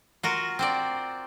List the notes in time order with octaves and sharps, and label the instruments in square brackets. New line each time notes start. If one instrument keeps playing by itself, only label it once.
[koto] F4 F#4 A#4
C4 C5 D5